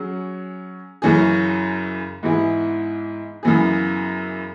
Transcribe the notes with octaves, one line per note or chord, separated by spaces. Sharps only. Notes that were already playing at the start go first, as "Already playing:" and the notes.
Already playing: F#3 C#4 G#4
F#2 C#3 E3 C#4 G#4
G#2 E3 B3 E4 G#4
F#2 C#3 E3 B3 G#4